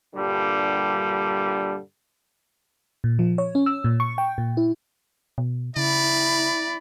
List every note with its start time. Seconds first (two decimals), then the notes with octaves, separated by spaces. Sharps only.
0.15 G2 A#2 D3 G3
3.04 A#2
3.19 F3
3.38 C#5
3.55 C#4
3.66 E6
3.84 A#2
4.00 C#6
4.18 G5
4.38 A#2
4.57 E4
5.38 B2
5.77 C#3 E4 D5 B5